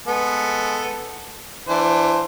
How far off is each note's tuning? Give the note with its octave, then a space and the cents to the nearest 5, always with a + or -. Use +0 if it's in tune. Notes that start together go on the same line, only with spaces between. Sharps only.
G#3 +10 B3 +0 A4 +0
E3 +30 D4 +20 C5 +0